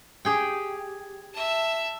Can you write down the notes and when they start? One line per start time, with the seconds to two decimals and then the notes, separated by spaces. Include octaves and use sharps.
0.25 G4 G#4 G5
1.34 E5 A5